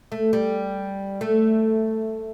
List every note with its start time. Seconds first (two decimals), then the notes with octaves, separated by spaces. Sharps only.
0.12 A3
0.33 G3
1.21 A3